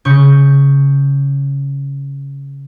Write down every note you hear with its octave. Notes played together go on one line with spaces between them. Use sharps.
C#3 C#6 G6